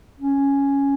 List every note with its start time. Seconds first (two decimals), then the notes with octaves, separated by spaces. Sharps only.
0.20 C#4